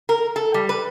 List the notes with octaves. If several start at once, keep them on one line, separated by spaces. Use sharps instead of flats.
A#4
A4
G3
B4